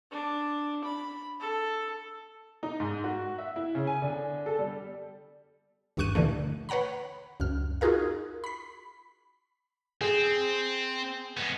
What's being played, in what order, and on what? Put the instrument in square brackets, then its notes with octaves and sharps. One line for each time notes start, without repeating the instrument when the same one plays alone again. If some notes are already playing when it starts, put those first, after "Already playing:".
[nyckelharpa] D4
B5
A4
[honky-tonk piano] D#4
G#2
F#4
E5
E4
C#3
G#5
D3
A4
G3
[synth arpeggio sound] G#1 D2 G2 C#6 F#6 D#7
A#2 D3 E3 A3
B4 C#5 F#5 A#5 B5
C#2 F#2 F6
D#4 F4 F#4 G#4 A#4 F5
B5 B6
[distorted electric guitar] C4 [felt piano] G#4
[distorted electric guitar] G#3 B3